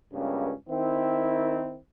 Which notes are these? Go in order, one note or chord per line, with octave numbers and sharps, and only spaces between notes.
C#2 G2 C#3 A#3 B3 C#4
D#3 C4 E4